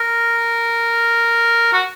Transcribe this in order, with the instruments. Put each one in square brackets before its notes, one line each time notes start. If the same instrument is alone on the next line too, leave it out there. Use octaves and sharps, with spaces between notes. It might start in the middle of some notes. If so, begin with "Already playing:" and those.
Already playing: [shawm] A#4
F#4